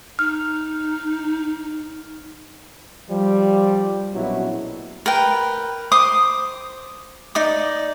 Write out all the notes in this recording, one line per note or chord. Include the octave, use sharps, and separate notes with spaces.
D#4 F6
F3 G3
A#1 B2 F#3 C#4 E4
A#4 B4 G5
C5 D6 D#6
D#4 D5 D6